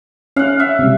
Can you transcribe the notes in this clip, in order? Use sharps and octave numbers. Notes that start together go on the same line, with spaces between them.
C#4 F5 F#5
E5
C3 G3